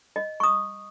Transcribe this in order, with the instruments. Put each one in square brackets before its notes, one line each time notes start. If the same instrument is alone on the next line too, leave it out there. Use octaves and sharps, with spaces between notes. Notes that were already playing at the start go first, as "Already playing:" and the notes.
[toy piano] D#5
C#6 D#6